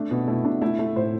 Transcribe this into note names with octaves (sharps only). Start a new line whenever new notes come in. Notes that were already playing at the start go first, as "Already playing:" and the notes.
Already playing: A3 D4
B2
A3 E4
B2 D4
A3 E4
A3
A2 C5